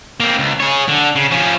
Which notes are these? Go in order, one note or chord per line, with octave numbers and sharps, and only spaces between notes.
A#3 C4
C#2
G#4 C#5
D3
C#3
F3 C#4